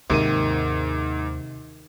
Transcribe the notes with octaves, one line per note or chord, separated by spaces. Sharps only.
D#2 G#2 C3 D#3 D6 D#7